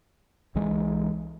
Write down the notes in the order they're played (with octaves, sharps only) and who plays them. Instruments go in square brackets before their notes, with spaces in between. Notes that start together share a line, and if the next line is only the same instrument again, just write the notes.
[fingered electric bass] C2 E3 G#3